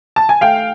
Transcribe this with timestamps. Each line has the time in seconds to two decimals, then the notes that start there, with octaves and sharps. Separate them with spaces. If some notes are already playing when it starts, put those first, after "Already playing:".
0.16 A5
0.29 G#5
0.41 A3 F5 G5